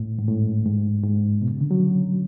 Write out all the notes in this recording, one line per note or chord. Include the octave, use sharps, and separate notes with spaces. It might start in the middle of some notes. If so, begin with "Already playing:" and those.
Already playing: A2
G#2
A2
G#2
G#2
B2
C#3
D3
F#3